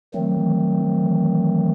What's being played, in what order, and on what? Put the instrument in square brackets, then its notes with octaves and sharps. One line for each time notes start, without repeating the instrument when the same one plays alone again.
[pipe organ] D#3 F#3 A3 C4 [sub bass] F3
[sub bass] E3
F3
F3
E3